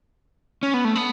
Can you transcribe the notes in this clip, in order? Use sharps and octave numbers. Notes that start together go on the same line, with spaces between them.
C#4
B3
A3
B3